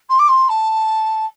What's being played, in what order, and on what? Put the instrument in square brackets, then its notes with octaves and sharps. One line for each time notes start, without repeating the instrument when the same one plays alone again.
[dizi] C6
D6
C6
A5